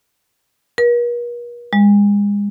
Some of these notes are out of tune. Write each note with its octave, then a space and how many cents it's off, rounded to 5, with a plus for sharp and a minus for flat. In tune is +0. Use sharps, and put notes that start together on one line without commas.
A#4 +45
G#3 -35